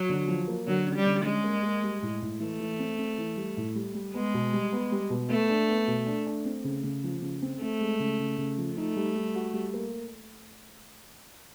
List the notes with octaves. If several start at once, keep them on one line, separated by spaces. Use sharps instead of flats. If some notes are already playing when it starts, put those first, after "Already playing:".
Already playing: F#3
D3
F3
A#3
D3 F#3
C#4
G3
D3
G#3 C#4
A#3
A#3
G3
A2
A2
E3 A3
E3
C4
C4
E3
G3
A2
G3
G3
G#3 B3
B2
G3
B3
G3
B2
A3 B3
D4
B3
B2
D4
D4
C4
C#3
C#3
F3
C#3
C4
A3 C4
G#3
C#3
C#3
C#3
F3
A3 D#4
G3
G3
F#4
G3
A#3